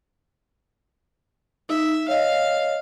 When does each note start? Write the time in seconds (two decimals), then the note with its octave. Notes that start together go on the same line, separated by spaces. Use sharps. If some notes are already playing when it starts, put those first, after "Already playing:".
1.69 D#4 E5
2.08 C#5 D#5 F5